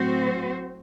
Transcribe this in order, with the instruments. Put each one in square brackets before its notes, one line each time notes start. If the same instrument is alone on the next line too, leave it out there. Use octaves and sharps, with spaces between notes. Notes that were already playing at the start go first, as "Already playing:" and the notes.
Already playing: [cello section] A2 F#3 C4 F#4 C5